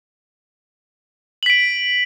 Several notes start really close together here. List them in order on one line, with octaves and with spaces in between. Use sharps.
F#7 B6 D7